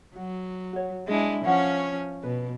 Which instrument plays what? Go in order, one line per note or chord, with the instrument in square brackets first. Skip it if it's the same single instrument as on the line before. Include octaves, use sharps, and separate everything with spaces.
[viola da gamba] F#3 [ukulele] F#4
[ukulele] F#4 C#5
[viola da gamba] G#3 D4 E4 [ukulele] G#4
[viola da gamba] F3 C#4 C#5 [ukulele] F5 F#5 G#5
[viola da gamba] B2 [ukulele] B4